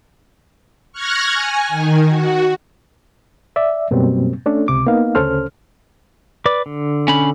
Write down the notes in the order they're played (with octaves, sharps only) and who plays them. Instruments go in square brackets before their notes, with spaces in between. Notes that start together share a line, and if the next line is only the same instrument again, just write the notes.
[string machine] C#6 F6 F#6 G#6 A#6
G#5
D#3
F#4
[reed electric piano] D5 E5
F#2 B2 F#3 G3 A#3 C4
A3 C#4 D4 A4
C#2 C3 D6
A#3 B3 D#4 F5
D2 C#3 C#4 A4 C5 F6
[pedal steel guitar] B4 D5 D6
D3
[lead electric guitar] C#4 B5